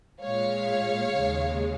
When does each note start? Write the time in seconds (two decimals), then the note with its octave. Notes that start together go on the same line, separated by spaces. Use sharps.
0.22 A#2 G#3 C#5 F5
1.15 D#2 C#3 G#3